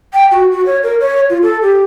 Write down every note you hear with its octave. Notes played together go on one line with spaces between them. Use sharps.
G5
F#4
F#4
C#5
A#4
C#5
F4
A4
G4